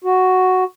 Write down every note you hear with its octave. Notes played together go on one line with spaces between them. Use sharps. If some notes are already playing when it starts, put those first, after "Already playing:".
F#4